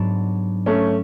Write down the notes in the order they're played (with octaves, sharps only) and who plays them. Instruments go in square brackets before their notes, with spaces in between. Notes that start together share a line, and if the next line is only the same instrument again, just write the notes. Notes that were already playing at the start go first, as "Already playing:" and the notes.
Already playing: [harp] G#2 F#3 B3 D4
[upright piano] A3 C#4